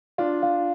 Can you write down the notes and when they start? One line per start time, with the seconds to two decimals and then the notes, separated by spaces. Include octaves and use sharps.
0.18 D4 F4 F5
0.43 F5